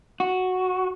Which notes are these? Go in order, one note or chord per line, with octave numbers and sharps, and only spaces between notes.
F#4